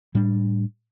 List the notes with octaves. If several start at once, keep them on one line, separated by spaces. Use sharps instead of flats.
A2 G3 D4